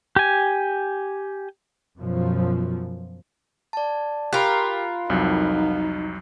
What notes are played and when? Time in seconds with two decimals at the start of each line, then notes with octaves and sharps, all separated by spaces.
0.16 G4 G#5
1.97 F#2 B2 F3
3.73 D5 A5
4.33 F4 G4 A#4 B5 F#6
5.10 C2 F2 F#3 D#4